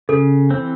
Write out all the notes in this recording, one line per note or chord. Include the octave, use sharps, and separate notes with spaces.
C#3 A4
E3 C4